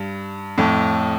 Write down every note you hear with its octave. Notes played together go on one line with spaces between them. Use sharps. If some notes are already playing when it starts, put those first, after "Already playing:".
Already playing: G2
F2 A2